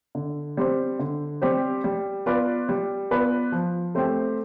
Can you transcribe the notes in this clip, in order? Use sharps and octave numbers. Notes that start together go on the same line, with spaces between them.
D3
G3 C4 G4 C5
D3
G3 C4 G4 C5
G3
B3 F4 B4 D5
G3
B3 F4 B4 D5
F3
A3 C4 G4 C5